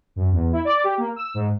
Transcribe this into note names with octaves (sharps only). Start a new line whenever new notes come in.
F#2
E2
E4
D5
G4
A#3
E6
G#2